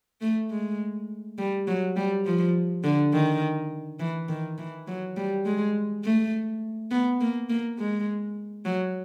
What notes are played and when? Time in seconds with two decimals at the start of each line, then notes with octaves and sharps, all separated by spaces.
0.21 A3
0.50 G#3
1.38 G3
1.67 F#3
1.96 G3
2.26 F3
2.84 D3
3.13 D#3
4.00 E3
4.29 D#3
4.58 E3
4.87 F#3
5.17 G3
5.45 G#3
6.04 A3
6.91 B3
7.20 A#3
7.49 A#3
7.79 G#3
8.65 F#3